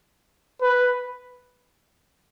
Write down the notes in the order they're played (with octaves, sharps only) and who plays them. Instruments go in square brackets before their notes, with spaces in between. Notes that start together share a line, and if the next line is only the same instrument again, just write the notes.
[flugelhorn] B4